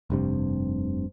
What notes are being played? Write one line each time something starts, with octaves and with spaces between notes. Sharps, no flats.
F1 G2 C3